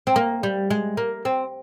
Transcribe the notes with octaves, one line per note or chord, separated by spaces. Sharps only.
C4
A#3
G3
G#3
A#3
C4